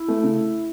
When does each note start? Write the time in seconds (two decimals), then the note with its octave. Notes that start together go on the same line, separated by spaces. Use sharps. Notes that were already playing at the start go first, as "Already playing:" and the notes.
Already playing: E4
0.08 A3
0.23 C#3